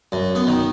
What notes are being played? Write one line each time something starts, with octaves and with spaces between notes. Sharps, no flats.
F#2
B3
D#3